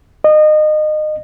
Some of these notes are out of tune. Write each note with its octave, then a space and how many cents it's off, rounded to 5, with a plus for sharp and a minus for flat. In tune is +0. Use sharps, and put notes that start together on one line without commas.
D#5 -25